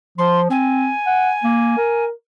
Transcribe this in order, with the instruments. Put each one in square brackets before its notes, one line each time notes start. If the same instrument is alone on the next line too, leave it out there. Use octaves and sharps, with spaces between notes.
[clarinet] F3 [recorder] C6
[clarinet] C4 [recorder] G#5
[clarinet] F#5
A#3
A#4